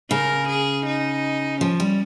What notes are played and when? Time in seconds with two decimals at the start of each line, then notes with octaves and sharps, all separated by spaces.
0.11 C#3 A#4
0.49 G#4
0.86 D#4
1.61 F3 C#4
1.80 G3